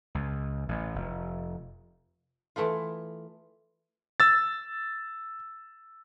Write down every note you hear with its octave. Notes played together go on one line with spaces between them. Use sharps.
C#2
A1
F1
E3 A3 B3 F4
E6 A6